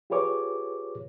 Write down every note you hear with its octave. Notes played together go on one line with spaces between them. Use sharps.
F4 G4 G#4 B4 C#5 D6